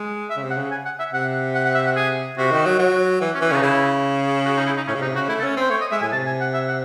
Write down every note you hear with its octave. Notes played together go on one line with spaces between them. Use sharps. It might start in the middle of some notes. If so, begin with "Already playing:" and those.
Already playing: G#3
E5
C#3
C3
F#5
C#3
G#5
F#5
E5
C3 F#5
F#5
F#5
E5
F#5
G#4
C3 F#4
D#3
F#3
F#3
E3
C#4
E3
C#4
C#3
D#4
C#3 E4
F#4
D#4
E4
D#4
A2 C#4
C#3
C3 D#4
C#3 F#4
A3 E4
A4
C#4
C4 C5
A3 C#5
D#5
G#3 E5
A2 G#5
C3 A5
G#5
F#5
E5
F#5